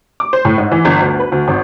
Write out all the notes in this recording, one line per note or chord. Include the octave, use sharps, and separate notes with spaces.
D6
C5
A2
G#2
E3
G1
D2
B4
D2
G#1